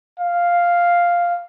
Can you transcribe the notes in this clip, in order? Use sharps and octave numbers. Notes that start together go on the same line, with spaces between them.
F5